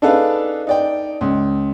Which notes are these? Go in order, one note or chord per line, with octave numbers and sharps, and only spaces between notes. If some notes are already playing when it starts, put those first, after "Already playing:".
D4 D#4 G#4 A4 B4 F5
D#4 D5 G5
C#2